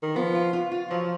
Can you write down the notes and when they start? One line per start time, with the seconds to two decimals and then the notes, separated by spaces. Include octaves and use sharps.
0.03 D#3
0.16 F3 B3
0.35 F4
0.53 F4
0.71 F4
0.90 F3 F#3